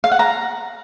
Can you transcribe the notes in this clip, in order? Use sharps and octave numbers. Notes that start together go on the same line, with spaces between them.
F5
F#5
A#5